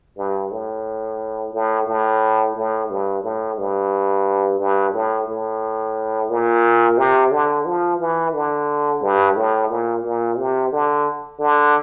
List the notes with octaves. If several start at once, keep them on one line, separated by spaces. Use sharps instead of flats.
G2
A2
A2
A2
A2
G2
A2
G2
G2
A2
A2
A#2
C3
D3
F3
E3
D3
G2
A2
A#2
A#2
C3
D3
D3